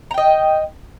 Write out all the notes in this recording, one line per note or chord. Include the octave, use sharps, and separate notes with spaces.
D#5 G5 A#5